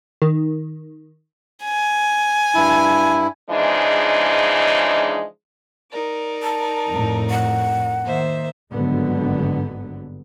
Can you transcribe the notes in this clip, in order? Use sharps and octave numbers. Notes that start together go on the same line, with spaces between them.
D#3
G#5
G2 E4
C#3 E3 F3 G#3 D4 D#4
D#4 A#4 D5
A5
F2 A2
F#5
D#3 A#3 C5 E5
G#1 G2 D3 F#3 B3